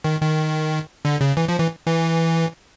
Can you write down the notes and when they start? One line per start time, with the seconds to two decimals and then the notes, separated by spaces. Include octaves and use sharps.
0.04 D#3
0.21 D#3
1.05 D3
1.21 C#3
1.37 E3
1.48 F3
1.59 E3
1.87 E3